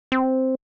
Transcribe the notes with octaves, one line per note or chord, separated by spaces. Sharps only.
C4